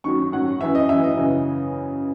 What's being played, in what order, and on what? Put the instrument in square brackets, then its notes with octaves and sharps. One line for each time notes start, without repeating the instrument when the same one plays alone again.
[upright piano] F#2 D#3 F#3 C#6
F#2 D#3 F#3 F#5
F#2 E3 E5
D#5
F#2 E3 E5
D#5
F#2 C#3 E3